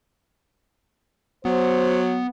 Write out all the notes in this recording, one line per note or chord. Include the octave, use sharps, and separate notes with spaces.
F#3 B3 C5